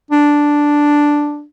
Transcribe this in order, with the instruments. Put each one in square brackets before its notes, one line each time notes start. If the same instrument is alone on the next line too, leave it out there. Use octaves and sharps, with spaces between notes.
[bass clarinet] D4